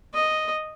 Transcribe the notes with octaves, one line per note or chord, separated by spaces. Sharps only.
D#5